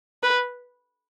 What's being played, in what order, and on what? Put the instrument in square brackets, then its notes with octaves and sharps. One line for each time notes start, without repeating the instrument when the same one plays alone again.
[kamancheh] B4